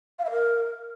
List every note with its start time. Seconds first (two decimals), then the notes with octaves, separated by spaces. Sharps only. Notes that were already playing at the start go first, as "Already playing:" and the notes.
0.19 F5
0.25 E5
0.31 A#4